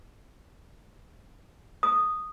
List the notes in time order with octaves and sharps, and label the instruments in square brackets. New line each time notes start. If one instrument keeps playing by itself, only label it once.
[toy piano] D#6